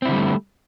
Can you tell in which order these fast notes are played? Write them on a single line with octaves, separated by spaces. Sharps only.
C4 E4 D3 G3 A3